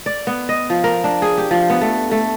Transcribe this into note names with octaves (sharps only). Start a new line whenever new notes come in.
D5
B3
D#5
F3
A#4
D4
G#4
G4
F3
B3
A3
A3